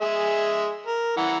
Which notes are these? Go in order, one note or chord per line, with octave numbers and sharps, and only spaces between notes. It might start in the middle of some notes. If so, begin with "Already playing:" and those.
G#3 G#4 E5
A#4
E3 F#5 A#5